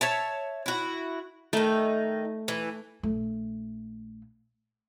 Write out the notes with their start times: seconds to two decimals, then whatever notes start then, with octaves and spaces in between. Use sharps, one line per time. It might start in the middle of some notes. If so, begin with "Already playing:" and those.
0.01 C#5 E5 A5
0.66 E4 F#4
1.53 D#3 A3 D#4
2.48 E3
3.03 A#1 A3